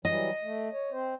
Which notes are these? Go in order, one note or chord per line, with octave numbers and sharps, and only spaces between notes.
E3 F#3 G3 D#5
A3
C#5
C4 C5